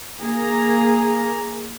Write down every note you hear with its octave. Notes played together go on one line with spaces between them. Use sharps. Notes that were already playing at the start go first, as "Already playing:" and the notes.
A#3 G#4 A#5